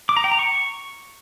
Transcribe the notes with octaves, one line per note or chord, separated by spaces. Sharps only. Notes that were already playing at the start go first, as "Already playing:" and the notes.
D6
A#5
G5
A#5
C#6